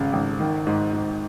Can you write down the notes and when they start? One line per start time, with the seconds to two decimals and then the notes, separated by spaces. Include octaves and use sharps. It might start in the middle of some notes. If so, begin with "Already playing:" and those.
Already playing: G#1 C#3
0.13 G#1
0.40 D#3
0.67 G#2
0.93 G#2